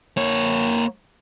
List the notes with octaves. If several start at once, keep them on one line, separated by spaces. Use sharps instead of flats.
A#3 C#5